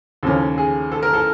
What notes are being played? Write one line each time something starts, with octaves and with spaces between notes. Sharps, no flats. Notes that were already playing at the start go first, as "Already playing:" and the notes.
D#2 C#3 F3 A#3 C#4 A4
G#4
A4
A#4
A4